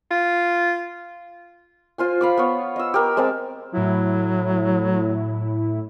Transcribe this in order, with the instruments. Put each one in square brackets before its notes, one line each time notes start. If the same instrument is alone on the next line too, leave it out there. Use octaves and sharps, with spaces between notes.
[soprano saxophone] F4
[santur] F4 C5 G#5
F5 B5 D6
B3 C#5
D#5 E6
G4 A#4
G#3 C4 A#4 A5
[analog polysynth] A2 E4 [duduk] F#3